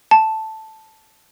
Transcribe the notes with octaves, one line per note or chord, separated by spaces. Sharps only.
A5